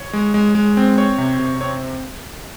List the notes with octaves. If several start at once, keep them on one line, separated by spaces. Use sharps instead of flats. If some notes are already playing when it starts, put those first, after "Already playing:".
Already playing: C#5
G#3
G#3
G#3
C4
C4 C#5
C3
C3
C4 C#5